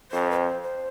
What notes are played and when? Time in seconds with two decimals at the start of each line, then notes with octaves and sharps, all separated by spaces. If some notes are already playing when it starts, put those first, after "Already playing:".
0.11 F2 C5
0.31 B4
0.36 C5
0.62 C5